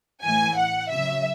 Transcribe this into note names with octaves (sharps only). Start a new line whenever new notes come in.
A2 E3 G#5
F#5
C#3 F#3 E5